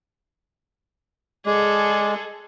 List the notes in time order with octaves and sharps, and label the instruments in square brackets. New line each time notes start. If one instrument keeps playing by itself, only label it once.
[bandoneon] G#3 [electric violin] G#4 A4 [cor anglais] D5